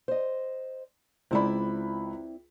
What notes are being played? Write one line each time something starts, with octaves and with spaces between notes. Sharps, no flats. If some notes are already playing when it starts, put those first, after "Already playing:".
C5 D#5
C#2 C4 E4 D5 B5